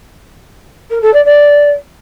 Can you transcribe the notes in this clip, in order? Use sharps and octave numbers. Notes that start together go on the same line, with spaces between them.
A#4
A4
D5
D5